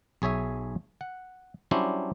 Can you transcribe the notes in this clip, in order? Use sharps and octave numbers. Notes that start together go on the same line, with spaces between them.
B1 G#4 C#5 E5 G#5
F#5
F#3 G3 C#4 D4 E4 C5